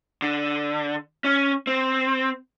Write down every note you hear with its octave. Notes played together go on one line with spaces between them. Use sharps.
D3
C#4
C4